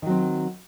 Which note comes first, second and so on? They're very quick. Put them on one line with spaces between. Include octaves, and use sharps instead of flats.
D#3 F#3 C4